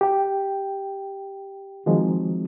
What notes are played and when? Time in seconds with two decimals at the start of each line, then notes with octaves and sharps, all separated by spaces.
0.01 G4 G5
1.86 D#3 F3 F#3 G#3 C4